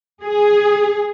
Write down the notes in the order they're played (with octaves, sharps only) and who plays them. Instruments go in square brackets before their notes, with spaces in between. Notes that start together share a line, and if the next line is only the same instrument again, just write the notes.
[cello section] G#4